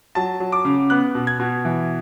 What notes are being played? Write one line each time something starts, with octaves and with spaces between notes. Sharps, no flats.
F#3 A5
F#3
D6
C#3
B3 F#6
B2
G#6
B2
E3